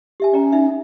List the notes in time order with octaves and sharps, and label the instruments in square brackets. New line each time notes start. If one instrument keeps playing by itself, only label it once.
[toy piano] G4 E5 G#5
[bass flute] C#4 [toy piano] D5 G5 A#5
[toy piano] D#4 E5